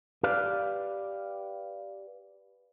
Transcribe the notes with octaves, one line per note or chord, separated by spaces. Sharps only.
G4 B4 D5 F5